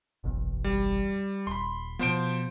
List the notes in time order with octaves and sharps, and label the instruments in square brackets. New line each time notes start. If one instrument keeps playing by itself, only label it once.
[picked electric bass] F#1 B1 E2
[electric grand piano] G3
[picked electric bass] D#1 [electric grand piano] B5 C6
[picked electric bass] B2 B3 [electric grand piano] F3 C5 D7